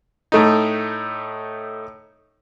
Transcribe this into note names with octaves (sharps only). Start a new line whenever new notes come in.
A2 A3 D#4